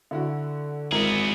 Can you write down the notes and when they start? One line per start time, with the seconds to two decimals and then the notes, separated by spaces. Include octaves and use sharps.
0.11 D3 E4 F#4
0.92 G#1 B3 E4 G#4 A#4